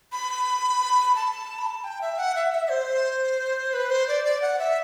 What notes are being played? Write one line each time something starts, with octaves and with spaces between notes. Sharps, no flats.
B5
A5
B5
A5
G5
E5
F#5
E5
E5
C5
B4
C5
D5
D5
F#5
E5